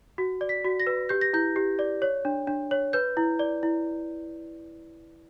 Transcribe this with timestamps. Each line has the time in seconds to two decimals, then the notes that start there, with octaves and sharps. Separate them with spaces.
0.18 F#4
0.41 D5
0.49 B6
0.65 F#4
0.80 A#6
0.87 B4
1.09 G4 G6
1.21 A#6
1.33 E4 G6
1.56 G4
1.79 D5
2.02 C#5
2.25 D4
2.47 D4
2.71 C#5
2.93 B4 G6
3.17 E4
3.39 D5
3.63 E4